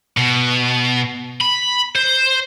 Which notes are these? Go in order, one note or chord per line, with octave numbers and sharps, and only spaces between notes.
B2
B5
C5